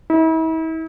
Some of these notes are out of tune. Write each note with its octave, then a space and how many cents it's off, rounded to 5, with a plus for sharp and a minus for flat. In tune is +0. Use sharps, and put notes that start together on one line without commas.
E4 -40